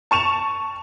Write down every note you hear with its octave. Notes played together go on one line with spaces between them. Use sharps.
A5 C#6 E7 F7